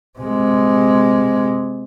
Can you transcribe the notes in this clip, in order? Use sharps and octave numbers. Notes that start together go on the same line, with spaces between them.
C3 G#3